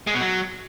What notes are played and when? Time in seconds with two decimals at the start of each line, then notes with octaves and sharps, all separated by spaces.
0.07 G#3
0.14 B2
0.21 F#3